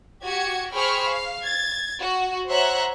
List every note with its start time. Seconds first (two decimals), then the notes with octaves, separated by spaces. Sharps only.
0.24 F#4 G4 G#6 C#7
0.73 G#4 C5 G5 B5 C#6 F6
1.09 F5
1.42 G#6 A6
1.99 F#4
2.49 C5 C#5 E5 F#5 A#5 F#6